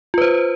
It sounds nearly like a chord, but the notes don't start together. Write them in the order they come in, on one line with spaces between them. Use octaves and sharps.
F4 B4 C5